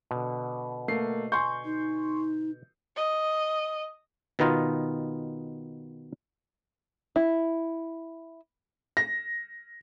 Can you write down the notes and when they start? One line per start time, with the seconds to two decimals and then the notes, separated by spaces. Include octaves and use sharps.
0.11 B2 D3
0.88 A3 A#3 C7
1.32 G#5 C6 C#6 G6
1.65 D#4
2.96 D#5
4.39 B2 D#3 B3 D#4 F4
7.16 E4
8.97 A#6